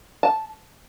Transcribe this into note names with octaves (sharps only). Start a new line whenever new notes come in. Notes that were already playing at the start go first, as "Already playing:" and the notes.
A5